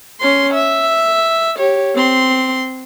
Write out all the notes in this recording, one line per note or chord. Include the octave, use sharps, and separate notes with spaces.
C#4 C6
E5
G4 C#5
C4 C6